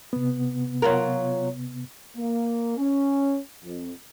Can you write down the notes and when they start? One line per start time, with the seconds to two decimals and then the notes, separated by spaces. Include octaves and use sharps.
0.13 C3 B3
0.82 F#3 F4 A#4
2.17 A#3
2.78 C#4
3.64 F2